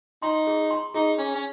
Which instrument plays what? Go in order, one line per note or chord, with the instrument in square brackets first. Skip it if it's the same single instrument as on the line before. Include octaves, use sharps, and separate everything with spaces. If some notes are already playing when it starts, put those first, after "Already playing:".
[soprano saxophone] D#4 [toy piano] C6
[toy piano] G#4
C6
[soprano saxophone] D#4 [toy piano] G#4
[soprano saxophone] C#4 [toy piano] G#4
[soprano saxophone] C#4